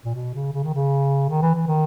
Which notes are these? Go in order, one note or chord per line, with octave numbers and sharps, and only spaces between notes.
A#2
B2
C#3
C#3
D#3
C#3
D#3
E3
E3
D#3